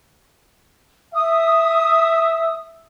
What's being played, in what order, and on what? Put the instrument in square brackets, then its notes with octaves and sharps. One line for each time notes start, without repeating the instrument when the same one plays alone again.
[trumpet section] E5 [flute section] D#6